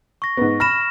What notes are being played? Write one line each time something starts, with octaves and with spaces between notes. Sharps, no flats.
C#6 A#6
G#2 B3
B5 F6 A#6 E7